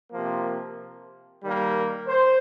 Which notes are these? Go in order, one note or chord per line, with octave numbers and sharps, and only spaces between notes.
C3 F3 A#3
D#3 G3 A#3
C5